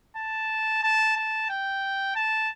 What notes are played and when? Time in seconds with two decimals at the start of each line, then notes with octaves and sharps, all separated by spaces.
0.17 A5
0.83 A5
1.17 A5
1.50 G5
2.16 A5